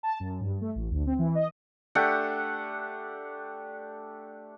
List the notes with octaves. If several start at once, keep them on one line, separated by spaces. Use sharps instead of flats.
A5
F#2
G2
A3
A1
D2
C4
E3
D#5
A3 D4 G4 F#5